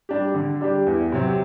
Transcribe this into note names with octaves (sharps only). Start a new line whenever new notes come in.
G3 D4 G4
D3
G3 D4 G4
E2
C3 F#3 C4